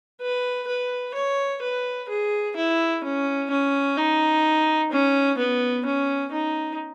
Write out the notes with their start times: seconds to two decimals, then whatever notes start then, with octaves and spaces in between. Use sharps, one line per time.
0.21 B4
0.67 B4
1.14 C#5
1.62 B4
2.09 G#4
2.56 E4
3.04 C#4
3.51 C#4
3.96 D#4
4.91 C#4
5.38 B3
5.86 C#4
6.32 D#4